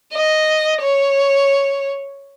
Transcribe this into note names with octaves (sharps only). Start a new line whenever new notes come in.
D#5
C#5